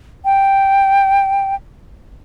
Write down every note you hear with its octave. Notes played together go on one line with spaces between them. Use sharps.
G5